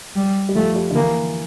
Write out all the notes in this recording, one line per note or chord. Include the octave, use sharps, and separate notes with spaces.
G3
G3
F3 A3
G3
D3
E3 A#3